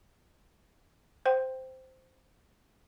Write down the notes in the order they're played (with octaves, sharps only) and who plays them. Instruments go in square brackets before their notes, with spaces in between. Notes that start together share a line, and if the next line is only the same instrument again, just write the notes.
[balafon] C5 G5 C6